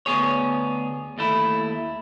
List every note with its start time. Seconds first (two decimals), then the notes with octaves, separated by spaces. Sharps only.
0.06 D2 B3 G#4 C#5
1.18 D#2 A3 E4